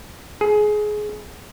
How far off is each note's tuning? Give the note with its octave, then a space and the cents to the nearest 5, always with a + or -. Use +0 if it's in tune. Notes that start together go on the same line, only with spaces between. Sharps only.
G#4 +20